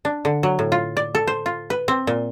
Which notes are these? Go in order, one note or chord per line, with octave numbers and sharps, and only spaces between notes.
D4
D3
F#3
A2
F4
D5
A4
C5
F4
B4
C4
A#2